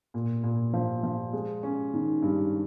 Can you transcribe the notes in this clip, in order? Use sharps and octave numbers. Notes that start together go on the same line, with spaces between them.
A#2
A#2
F3
F3
G#3
C#4
D#3
G2